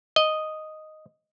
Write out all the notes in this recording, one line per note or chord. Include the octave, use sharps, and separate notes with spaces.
D#5